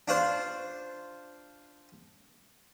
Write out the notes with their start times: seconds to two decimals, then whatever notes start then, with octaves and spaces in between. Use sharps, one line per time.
0.08 D4 F4 C5